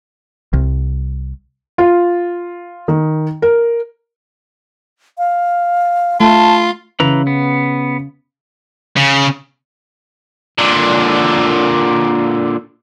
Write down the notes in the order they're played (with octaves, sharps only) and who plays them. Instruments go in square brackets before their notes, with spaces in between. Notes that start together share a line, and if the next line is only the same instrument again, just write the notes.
[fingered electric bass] C2
[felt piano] F4
D#3
A#4
[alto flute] F5
[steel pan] A3 [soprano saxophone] F4 [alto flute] A5
[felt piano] C#3 [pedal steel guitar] E3 B4 A#5
[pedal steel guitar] B3
[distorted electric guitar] C#3
[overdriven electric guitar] A#2 D3